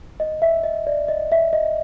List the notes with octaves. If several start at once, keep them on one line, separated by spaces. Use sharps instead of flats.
D#5
E5
D#5
D5
D#5
E5
D#5